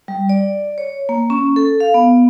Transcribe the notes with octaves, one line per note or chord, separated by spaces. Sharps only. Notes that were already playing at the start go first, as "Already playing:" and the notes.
G3
D5
C#5
A#3
C#4
A4
F5
B3